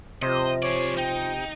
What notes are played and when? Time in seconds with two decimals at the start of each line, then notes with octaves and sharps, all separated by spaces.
0.22 C3 F3 C5 D#5
0.63 G#4 C#5 D5
0.98 D#4 G5